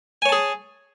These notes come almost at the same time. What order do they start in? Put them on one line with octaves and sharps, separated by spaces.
G#5 C#5 A5 G#4